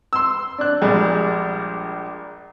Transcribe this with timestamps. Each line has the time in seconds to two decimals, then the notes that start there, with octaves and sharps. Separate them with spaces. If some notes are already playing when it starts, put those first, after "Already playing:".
0.13 C6 E6
0.58 D4 F#6
0.82 A#1 G3 G#3